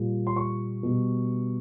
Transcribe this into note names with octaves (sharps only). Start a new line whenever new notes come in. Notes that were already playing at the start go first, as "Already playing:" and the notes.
Already playing: A#2 G3
C6
C#6
B2 G3